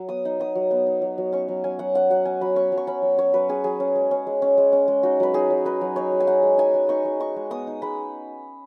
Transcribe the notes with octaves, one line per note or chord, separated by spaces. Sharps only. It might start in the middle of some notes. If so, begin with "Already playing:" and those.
Already playing: F#3
B3 D#6
D#4
F#3 D#6
F#3
B3
D#4
F#3
F#3
C#4 C#6
F#3
C#4 G#5
F#3 F#5
C#4 F#5
F#3 F#5
C#4 G#5
F#3 B5
C#4 C#6
F#3
C#6
C#4 B5
F#3
C#4 C#5
F#3 B4
C#4 G#4
F#3 G#4
C#4
G#3
C#4
G#3
C#4
G#3
C#4
G#3
D#4 F#4
F#3 B4
D#4 G#4
F#3
D#4 B4
F#3
D#4 C#5
F#3
G#5
D#4 F#5
G#3
D#4 G#5
G#3
D#4 C#6
G#3
D#4 C#6
G#3
B3 D#6
D#4
G#3 B5